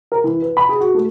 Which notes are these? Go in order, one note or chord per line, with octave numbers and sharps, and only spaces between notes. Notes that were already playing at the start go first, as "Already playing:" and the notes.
A#4
E3
B4
B5
G#4
F#4
A3